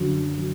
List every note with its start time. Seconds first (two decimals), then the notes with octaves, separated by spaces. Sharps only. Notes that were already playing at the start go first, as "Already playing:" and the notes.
Already playing: F#2 D3 F#3
0.38 F#3